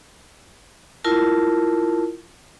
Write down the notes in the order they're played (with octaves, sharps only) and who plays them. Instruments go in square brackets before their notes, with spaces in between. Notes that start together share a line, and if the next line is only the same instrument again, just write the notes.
[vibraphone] E4 F4 A#4 A5